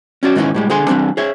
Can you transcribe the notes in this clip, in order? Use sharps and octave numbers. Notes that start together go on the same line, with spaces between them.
C#4 F#4 D5
G#2 D#3 E3 C4 C#4 D#4
A2 G3 G#3
D3 G#4 G#5 C6
E3 G3 C4 D4
G#4 C#5 E5